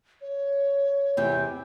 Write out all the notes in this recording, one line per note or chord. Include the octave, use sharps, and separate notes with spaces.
C#5
E2 C3 G5